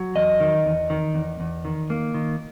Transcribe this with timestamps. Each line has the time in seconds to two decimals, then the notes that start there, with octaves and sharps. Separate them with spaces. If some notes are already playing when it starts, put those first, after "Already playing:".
Already playing: F#3
0.15 E2 D#5
0.40 D#3
0.65 E2
0.90 D#3
1.15 E2
1.40 E2
1.65 D#3
1.90 A#3
2.14 D#3